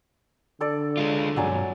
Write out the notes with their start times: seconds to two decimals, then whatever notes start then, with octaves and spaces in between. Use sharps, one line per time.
0.60 D3 A4 D5
0.97 G#3 F4
1.36 B1 G2 F#3 D5 G#5